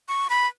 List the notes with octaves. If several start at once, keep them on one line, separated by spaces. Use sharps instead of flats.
C#6
B5